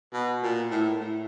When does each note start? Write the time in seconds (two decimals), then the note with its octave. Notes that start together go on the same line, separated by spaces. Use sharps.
0.13 B2
0.43 A#2
0.71 A2
1.00 A2